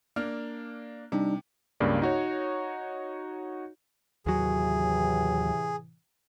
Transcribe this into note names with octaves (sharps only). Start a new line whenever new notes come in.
A#3 D4 F6
C3 G3 D4 D#4
C#2 G2 C#3 A#3 D5
D#4 F#4 C#5
D#2 A2 C3 E3 F#3 G#4